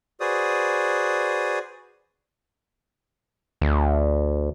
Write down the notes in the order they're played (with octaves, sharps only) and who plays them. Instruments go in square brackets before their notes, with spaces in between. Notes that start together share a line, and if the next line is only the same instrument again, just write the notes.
[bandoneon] F#4 G#4 B4 C5 D5 D#6
[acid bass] D2